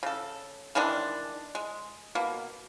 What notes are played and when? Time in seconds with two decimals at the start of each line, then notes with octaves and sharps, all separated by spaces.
0.03 C#3 A4
0.75 D#3 E3 G#3 D4
1.55 G#3
2.15 B2 A#3